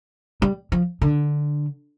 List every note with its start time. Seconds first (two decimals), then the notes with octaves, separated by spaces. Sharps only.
0.42 G3
0.72 F3
1.01 D3